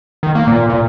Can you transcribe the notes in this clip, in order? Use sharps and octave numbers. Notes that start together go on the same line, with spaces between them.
D#3
A#3
A#2
A#2